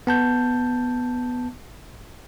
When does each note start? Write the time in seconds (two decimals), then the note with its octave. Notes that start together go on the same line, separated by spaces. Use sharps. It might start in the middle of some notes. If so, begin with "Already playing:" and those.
0.07 B3 A5 G6